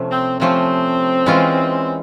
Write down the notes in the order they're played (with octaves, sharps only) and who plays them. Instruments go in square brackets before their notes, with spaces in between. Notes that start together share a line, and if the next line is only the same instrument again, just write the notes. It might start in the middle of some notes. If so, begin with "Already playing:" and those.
Already playing: [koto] C3 F3 A3 C#4
[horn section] C4
[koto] C3 F3 A3 C#4 [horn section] C4
[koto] E3 G#3 C#4 F4